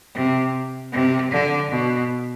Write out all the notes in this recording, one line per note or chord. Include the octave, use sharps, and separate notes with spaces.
C3
C3
D3
B2